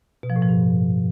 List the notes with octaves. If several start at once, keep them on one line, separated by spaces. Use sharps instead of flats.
B2
F3
A2
F3
G2